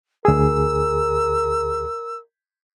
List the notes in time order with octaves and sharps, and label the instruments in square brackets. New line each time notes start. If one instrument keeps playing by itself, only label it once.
[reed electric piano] D2 G#4 [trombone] A#4 [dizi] E6